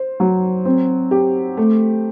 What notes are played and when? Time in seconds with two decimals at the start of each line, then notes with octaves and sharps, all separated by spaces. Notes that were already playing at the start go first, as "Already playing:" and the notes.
Already playing: C5
0.20 F#3
0.65 C4
1.11 G4
1.57 A3